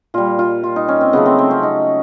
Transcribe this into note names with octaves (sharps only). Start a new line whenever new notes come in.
A#2 G3 F4
F4
F4
D#4
C#4
C4
C#3 F#3 A3 B3
C4
C4
C#4
D#4